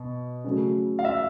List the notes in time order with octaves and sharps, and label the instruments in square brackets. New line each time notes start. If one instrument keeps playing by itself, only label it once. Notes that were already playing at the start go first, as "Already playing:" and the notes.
Already playing: [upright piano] B2
C#3 F#3 A3
[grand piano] F5
E5